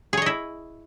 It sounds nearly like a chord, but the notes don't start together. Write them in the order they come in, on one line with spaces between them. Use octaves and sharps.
G#4 C#5 D#5 E4